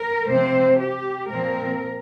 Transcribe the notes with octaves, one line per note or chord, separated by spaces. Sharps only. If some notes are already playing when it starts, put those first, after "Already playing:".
Already playing: A#4
C3 F3 C4 C5
G4
A#2 F3 C4 A#4